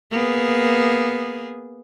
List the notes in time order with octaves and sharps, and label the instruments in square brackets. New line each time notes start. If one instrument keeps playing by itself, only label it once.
[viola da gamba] A#3 B3 G#4